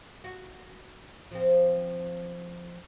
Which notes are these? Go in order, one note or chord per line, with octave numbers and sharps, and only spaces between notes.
F#4
F3 C4